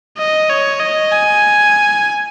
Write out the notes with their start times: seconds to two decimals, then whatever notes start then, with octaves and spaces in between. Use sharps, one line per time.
0.18 D#5
0.49 C#5
0.80 D#5
1.12 G#5